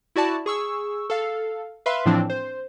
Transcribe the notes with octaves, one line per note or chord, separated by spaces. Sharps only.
E4 F#4 D5 A5
G#4 C#6 E6
A4 F5
B4 E5 F5 B5 C6
A2 E3 F3 C4 D4
C5